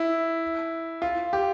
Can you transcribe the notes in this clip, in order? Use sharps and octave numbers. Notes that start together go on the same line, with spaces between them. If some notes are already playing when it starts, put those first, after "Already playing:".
Already playing: E4
F4
G4